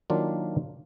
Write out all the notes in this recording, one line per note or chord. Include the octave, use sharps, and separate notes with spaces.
D#3 F#3 A#3 D4 F4